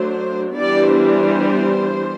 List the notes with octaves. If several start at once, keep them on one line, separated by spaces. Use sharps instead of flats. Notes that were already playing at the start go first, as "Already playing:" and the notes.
Already playing: F#3 A3 D4 C5
E3 G3 B3 D4 D5
C5